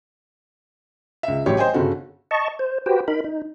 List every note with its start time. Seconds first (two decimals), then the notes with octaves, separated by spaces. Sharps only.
1.23 C#2 E5
1.46 A1 A2 F#3 G4 C#5
1.57 C5 D#5 G5 G#5
1.74 G1 C#3 F#4 A4
2.31 D#5 A5 C#6
2.59 C5
2.86 F#4 G4 B4 C5 G5
3.08 D#4 A#4 B5
3.24 D#4